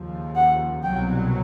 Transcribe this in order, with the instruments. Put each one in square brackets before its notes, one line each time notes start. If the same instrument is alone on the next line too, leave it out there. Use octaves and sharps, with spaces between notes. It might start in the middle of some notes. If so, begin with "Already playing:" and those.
Already playing: [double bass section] D#2 C#3 F3
[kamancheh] F#5
[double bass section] C2 B2 F#3 [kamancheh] G5